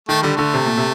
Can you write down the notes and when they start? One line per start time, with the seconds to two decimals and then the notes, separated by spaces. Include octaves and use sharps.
0.09 D#3 A3
0.22 D3 G3
0.36 D3 A3
0.54 C3
0.66 A#2
0.77 C3